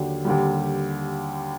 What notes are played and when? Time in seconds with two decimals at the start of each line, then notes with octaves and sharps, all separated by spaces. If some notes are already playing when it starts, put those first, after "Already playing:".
Already playing: D#2 D3 F#3
0.25 D#2 D3 G3